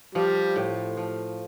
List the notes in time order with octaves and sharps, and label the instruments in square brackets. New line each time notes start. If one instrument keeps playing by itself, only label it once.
[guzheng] F3 [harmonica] G3
[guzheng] A2
F3